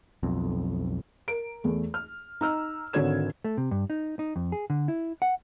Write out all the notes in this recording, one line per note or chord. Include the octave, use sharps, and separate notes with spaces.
B1 F2
A#4 D7
E2 A3
F6
D#4 E6 F6
G#1 D3 F#4 C#5 G#6 E7
A3
C3
G2
D#4
D#4
F2
G#4
D3
E4
F#5